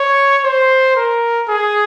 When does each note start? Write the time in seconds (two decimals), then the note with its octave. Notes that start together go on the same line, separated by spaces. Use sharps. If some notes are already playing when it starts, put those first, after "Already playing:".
Already playing: C#5
0.44 C5
0.96 A#4
1.48 G#4